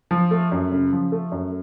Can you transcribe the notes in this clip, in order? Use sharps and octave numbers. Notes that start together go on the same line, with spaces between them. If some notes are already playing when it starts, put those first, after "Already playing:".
F3
A3
F#2
C#3
F3
A3
F#2